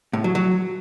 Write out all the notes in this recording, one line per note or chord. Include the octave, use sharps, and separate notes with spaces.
A2
F#3
F#3